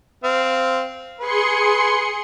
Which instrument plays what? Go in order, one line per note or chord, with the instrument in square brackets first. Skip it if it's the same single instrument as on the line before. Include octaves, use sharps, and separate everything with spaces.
[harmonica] C4 F5
[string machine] G#4 C6 C#7 [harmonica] B4